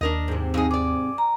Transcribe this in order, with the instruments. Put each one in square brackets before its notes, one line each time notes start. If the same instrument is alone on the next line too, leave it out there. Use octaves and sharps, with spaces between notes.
[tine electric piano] D#2 [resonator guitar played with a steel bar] D4 A#4 D#5
[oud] G#2 C3
[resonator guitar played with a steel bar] F2 D#4 G#4
[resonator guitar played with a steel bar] G#4 D5 [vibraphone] D6
[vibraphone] A#5